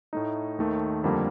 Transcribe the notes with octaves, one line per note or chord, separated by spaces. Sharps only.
A2 A3 D#4
D#2 D#3 A3
F2 D3 G3 A#3